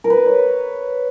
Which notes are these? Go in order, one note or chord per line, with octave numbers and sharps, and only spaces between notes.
A#4
B4
C#5